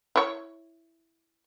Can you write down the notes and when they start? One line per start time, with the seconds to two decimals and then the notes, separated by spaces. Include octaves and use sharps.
0.16 E4 C#5